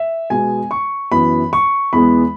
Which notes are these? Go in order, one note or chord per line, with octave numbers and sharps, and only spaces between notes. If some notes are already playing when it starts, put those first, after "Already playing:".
Already playing: E5
B2 G#3 B3 G#5
C#6
F#2 E3 B3 B5
C#6
E2 E3 G#3 B3 B5